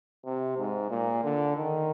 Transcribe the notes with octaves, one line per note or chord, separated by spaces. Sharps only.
C3
G#2
A#2
D3
D#3